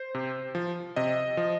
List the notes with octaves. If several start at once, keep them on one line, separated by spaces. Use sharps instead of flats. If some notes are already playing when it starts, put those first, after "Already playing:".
Already playing: C5
C3
F3
C3 D#5
F3